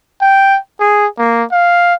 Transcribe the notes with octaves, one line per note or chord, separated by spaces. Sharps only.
G5
G#4
A#3
F5